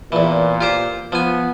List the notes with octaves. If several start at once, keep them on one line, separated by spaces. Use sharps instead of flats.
E2 A#2 E3
F4 G4 C5
F3 B3 G#5